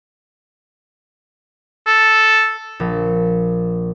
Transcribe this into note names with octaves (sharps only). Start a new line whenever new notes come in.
A4
A#1